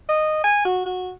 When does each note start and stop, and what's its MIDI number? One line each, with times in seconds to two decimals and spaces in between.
0.09 0.42 75
0.44 0.61 80
0.65 0.81 66
0.86 1.11 66